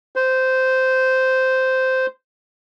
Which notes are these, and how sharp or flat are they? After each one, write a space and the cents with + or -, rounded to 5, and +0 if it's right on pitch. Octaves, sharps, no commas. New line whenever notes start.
C5 -10